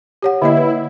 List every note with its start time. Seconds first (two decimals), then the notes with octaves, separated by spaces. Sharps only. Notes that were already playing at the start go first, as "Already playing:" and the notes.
0.22 G4 C#5 F#5
0.42 D3 A#3 E4 D#5
0.57 B4